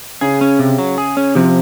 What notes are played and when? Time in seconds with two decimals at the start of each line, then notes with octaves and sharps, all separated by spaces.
0.21 C#3 G#4
0.41 C#4
0.59 C3
0.78 F#3
0.98 G#4
1.17 C#4
1.35 C3 F3